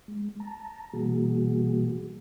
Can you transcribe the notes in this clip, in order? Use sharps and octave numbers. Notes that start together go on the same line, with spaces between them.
G#3
A5 A#5
B2 E3 G3 A#3 F#4 G#4